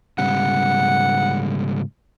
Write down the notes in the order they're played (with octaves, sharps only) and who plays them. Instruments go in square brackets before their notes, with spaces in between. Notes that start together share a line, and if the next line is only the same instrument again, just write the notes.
[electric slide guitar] G#2 C#3 G3 [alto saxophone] F#5